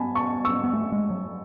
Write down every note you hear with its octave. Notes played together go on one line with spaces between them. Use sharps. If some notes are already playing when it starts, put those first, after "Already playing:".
Already playing: B3 G#5 A5 B5
A5 C#6
C#6 E6
B3
A3
G#3
F#3